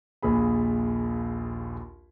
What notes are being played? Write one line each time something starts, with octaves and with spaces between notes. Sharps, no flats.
A#1 D#2 G#4 B5